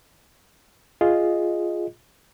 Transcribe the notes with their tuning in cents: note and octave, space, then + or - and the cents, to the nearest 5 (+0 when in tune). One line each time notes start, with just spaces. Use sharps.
F4 +0 G#4 +0 D#5 +0